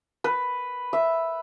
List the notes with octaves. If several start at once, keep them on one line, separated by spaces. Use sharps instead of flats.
B4
E5